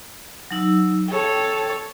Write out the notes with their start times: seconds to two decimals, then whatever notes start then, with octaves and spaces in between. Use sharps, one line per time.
0.51 F#3 D#4 E6
1.08 A4 C#5 G5